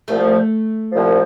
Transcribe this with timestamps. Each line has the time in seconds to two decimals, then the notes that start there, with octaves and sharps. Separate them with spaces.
0.08 C2 A#2 F3 A3
0.92 C2 A#2 F3